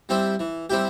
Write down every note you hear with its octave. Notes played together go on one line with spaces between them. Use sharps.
G3 C4 E4 G4
E3
G3 C4 E4 G4